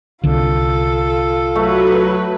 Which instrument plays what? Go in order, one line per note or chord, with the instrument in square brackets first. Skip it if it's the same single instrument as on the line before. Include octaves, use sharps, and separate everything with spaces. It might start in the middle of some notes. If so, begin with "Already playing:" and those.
[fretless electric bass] C2 D3 [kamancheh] F4 A4
[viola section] F#3 B4 [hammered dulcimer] A3